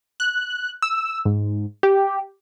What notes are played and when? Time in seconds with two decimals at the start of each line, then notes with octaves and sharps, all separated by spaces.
0.20 F#6
0.82 E6
1.25 G#2
1.83 G4